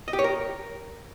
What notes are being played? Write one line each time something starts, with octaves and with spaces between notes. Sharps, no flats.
D#5
G4
C#5
A#4